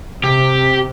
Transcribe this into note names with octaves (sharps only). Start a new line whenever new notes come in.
C3 G4